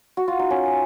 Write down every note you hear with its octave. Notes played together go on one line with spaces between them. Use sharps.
F#4
F4
D#4
C#4